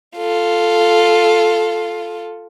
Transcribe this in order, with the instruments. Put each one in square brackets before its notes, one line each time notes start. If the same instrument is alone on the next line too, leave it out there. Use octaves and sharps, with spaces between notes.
[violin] F4 A4